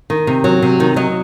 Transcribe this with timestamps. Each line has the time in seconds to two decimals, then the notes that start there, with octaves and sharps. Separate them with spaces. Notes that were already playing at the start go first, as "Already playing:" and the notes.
0.10 D#3
0.27 C3
0.44 F#3
0.62 C3
0.80 D#3
0.96 F#3 D#5